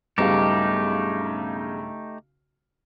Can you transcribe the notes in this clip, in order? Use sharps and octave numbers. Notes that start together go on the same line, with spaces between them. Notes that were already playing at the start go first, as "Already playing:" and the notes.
B1 G2 C#3 A3 D#4 G4 F5